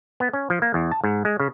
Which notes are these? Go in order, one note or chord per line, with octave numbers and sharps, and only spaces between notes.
B3
C#4
F3
A#3
E2
A5
G#2
G#3
C#3